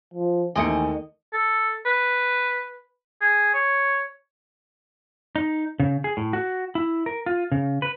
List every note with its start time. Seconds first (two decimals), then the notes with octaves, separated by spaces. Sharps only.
0.14 F3
0.56 D#2 D#3 E3 A3 C4 D#5 G#5 C#7
1.33 A4
1.86 B4
3.21 G#4
3.54 C#5
5.36 D#4
5.80 C#3
6.04 G#4
6.17 A2
6.33 F#4
6.75 E4
7.06 A#4
7.26 F4
7.52 C#3
7.82 B4